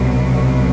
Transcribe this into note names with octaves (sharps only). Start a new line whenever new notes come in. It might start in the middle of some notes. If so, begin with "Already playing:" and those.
Already playing: C2 B2 F#3